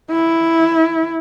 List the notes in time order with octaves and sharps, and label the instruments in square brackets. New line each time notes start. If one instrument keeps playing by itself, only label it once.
[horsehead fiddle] E4